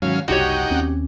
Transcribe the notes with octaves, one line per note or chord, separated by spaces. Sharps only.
G#2 D#3 F#3 C#4 F5
F#1 C2 D#4 F#4 G4 C#5 F#5 G5
D#2 C4 C#4